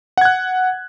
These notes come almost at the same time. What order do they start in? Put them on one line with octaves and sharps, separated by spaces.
F#5 G#6 F#6